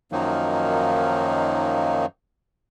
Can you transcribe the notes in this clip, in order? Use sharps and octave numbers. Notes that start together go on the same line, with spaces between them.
F#2 D#3 F3 F#3 A#3 D#4